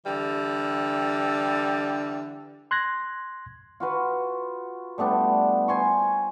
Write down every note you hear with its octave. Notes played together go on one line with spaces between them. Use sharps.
D3 E3 G3
C6 F#6 G#6 A#6
F4 F#4 B4
G3 A3 B3 D4
C5 G#5 C6 C#6